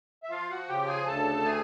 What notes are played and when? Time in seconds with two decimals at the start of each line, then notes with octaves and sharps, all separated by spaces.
0.23 E5
0.30 F3 F4 F5
0.50 F#4 F#5
0.68 C#3 G4 G5
0.88 G#4 G#5
1.07 D2 A4 A5
1.45 A3 G#4 G#5